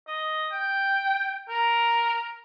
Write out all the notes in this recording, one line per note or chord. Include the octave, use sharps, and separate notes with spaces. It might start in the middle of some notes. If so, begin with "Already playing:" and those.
D#5
G5
A#4